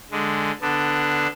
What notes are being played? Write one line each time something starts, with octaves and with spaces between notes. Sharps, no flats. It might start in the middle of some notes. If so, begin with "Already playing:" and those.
D3 G#3
D3 B3 D4